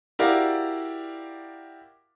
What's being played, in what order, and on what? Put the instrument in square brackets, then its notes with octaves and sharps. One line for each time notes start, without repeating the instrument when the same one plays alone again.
[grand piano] E4 F#4 G4 A#4 D5 F5